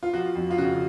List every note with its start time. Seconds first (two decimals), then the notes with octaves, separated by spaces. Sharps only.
0.03 F4
0.13 F3 F#4
0.35 F2
0.51 F4
0.58 C#3 F#4